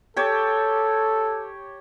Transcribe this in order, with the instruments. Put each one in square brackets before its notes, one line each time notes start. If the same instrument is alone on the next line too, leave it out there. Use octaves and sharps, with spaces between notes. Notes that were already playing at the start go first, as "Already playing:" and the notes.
[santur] G4 C#5 A5 [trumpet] A4